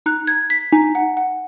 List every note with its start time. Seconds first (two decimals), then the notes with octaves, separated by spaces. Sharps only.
0.06 D#4 F#6
0.27 G#6
0.50 B6
0.72 D#4 G#5
0.95 F#5
1.17 F#5